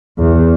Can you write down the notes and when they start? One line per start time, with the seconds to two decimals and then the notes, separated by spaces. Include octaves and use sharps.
0.18 E2